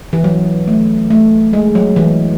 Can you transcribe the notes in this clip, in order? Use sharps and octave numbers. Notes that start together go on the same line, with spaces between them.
E3
F#3
A3
A3
G#3
F#3
E3